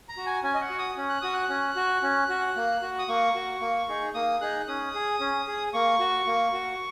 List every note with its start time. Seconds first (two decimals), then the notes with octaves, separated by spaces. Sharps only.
0.09 A#5
0.17 F#4
0.26 G#5
0.43 C#4 G#5
0.54 D#5
0.61 F#5
0.70 F#4
0.79 D#6
0.97 C#4
1.09 F#6
1.22 F#4 D#6
1.34 F#6
1.49 C#4
1.76 F#4
2.02 C#4
2.29 F#4
2.56 A#3
2.82 F#4
2.99 D#6
3.08 A#3 C#6
3.35 F#4
3.61 A#3
3.89 D#4 G#4
4.14 A#3 D#6
4.41 D#4 G#4 F#6
4.60 F#6
4.68 C#4 D#6
4.94 G#4
5.20 C#4
5.47 G#4
5.74 A#3 C#6
6.00 F#4
6.27 A#3
6.53 F#4